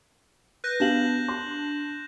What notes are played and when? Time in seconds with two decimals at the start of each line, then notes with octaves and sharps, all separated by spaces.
0.64 B4 F#6 G6 A#6
0.80 B3 D4 G4 F5 G6 E7 F#7
1.28 C6